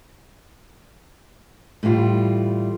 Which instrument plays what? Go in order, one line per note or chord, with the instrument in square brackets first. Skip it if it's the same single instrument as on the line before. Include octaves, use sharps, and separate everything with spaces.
[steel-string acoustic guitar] A2 E3 G3 F4